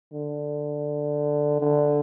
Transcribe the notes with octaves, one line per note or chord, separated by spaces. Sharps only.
D3
D3